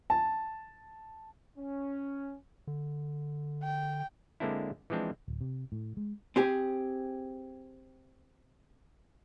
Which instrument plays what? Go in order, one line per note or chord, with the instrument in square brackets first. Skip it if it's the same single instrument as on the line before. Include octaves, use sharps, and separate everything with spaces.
[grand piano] A5
[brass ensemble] C#4
[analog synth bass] D3
[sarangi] G5
[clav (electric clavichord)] D3 G#3 A#3 C4 D4 E4
E3 F3 G#3 C4 D4
[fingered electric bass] D1
C3
A2
G#3
[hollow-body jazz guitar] C4 G4 G#4